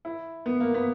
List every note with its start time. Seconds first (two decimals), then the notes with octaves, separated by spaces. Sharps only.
0.05 E4
0.46 B3
0.60 A#3
0.74 B3